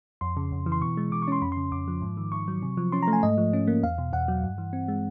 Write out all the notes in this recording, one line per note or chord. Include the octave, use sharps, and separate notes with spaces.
F2 C6
C#3
F2
E3
C6
B2 C#6
G#3
B2 D6
C#6
C#4 C6
F2 B5
C6
C#3
F2 D6
F3
G#2
D#3
G#2 C#6
F#3
C3
F3
C#4 C6
A#5
A3
G#5
G#2 D#5
F3
C#4
A#3
E2 F5
B2
E2 F#5
F#3
G2
E3
C4
G#3